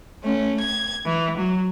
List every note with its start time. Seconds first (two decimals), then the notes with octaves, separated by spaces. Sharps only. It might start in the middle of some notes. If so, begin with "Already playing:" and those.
0.23 A3 C#4
0.59 G#6
1.04 E3
1.38 F#3